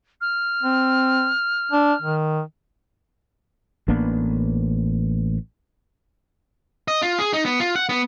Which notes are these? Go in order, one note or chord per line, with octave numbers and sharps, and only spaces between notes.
F6
C4
D4
D#3
A1 A#3 B3 D4
D#5
F4
G#4
D#4
B3
F4
F#5
B3